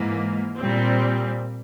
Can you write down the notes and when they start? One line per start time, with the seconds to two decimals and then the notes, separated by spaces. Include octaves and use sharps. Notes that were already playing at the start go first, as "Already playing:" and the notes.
Already playing: G#2 E3 A#3
0.57 A#2 G3 C4